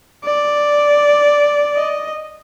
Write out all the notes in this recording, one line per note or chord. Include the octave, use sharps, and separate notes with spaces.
D5
D#5